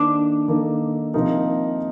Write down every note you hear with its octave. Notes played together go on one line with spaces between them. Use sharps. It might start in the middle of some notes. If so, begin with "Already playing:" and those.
Already playing: D#3 A#3 D4 D#4 A4
D#3 A#3 D#4 A4
C3 F3 A#3 D#4 A#4